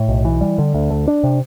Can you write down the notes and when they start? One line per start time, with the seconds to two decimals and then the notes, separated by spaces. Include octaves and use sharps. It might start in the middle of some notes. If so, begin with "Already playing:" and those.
Already playing: A2
0.09 B1
0.25 E3
0.41 G3
0.58 D3
0.74 D2
0.91 A3
1.08 D4
1.24 C3